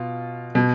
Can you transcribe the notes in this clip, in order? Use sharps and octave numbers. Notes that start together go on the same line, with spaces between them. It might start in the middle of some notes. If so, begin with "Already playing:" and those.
Already playing: B2 F4
B2